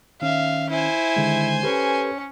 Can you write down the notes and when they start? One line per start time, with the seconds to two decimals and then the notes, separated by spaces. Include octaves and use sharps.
0.22 D#3 C#4 E5 F5
0.70 E4 C5 G#5
1.16 D3 D#3 G#3
1.63 C#4 G4 A4 B4